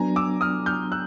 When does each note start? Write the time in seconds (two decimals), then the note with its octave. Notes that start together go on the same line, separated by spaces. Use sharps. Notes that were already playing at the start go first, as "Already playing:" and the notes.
Already playing: F#3 B3 D4 G#5 A#5
0.16 D6 E6
0.41 D#6 F6
0.66 F6 G6
0.92 E6 F#6